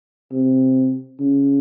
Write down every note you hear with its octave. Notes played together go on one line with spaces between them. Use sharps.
C3
C#3